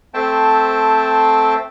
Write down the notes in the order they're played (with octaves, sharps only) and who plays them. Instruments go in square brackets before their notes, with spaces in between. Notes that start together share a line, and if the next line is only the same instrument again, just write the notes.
[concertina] A3 C4 C5 E5 G5 A5